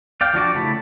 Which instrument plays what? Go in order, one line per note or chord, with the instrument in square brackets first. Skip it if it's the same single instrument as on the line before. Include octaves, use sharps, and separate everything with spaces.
[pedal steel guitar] D5 F5 G5
F3 D4 F#4 D5
C#3 A3 E4 A5 B5